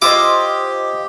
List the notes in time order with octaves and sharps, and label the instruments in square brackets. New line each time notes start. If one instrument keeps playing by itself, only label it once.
[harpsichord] E4 D6 [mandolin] F4 C5 D#5 [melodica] G4